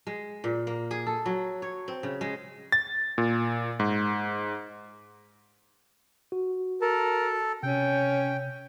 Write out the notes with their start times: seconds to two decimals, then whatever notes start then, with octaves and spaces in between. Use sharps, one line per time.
0.07 G#3
0.44 A#2
0.67 A#3
0.91 G#4
1.07 A4
1.26 F#3
1.62 C#5
1.88 C4
2.03 C#3
2.21 G#3
2.72 A6
3.18 A#2
3.80 G#2
6.32 F#4
6.81 A4 A#4 A5
7.63 C3 C#4 G5